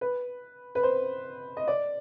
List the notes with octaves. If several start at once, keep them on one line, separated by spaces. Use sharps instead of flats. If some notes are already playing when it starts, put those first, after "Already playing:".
B4
B4
C5
D#5
D5